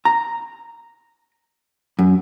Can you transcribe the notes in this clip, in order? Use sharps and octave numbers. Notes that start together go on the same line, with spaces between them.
A#5
F#2